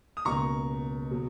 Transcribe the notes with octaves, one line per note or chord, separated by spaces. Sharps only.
D#6
C#2 B2 A#3 A#5 C#6
B2 F#3